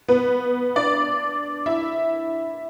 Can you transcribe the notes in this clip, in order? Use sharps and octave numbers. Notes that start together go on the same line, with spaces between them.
B3 B4
D4 D5
E4 E5